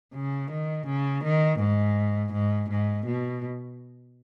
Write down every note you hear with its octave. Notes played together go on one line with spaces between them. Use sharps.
C#3
D#3
C#3
D#3
G#2
G#2
G#2
B2